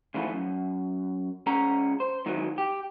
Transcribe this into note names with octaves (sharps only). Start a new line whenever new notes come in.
D2 G#2 E3 F3 A3 B3
F#2
C#2 C#4 G#4 F#5 A#5
C5
G#2 D#3 E3 F#3
G4